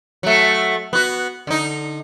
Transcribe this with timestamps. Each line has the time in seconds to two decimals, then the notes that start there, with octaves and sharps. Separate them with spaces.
0.23 F#3 A3
0.93 B3 F#4
1.47 D3 D#4